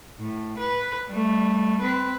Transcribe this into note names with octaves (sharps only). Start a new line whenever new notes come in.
A2
B4
G3 A3
C4 B4